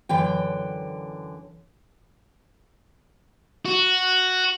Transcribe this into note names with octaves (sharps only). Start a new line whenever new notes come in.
F#2 D3 E3 G5
F#4